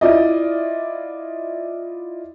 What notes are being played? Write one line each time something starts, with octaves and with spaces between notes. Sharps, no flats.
E4 F4 D5 D#5